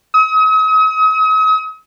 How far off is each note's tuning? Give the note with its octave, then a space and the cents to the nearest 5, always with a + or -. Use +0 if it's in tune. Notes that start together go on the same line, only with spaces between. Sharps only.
D#6 +40